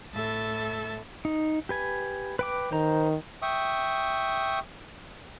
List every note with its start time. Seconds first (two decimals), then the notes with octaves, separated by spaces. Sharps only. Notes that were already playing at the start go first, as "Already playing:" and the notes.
0.13 A2 A4 E5 A6
1.25 D#4
1.69 G4 B4 G#5
2.39 B4 G5 D6
2.72 D#3 C5 A#5
3.42 E5 G5 C#6 D#6